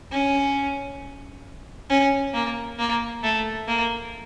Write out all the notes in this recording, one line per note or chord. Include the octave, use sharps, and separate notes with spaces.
C#4
C#4
A#3
A#3
A3
A#3